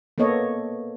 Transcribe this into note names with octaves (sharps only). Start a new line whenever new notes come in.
A#3 B3 A4 C#5 D#5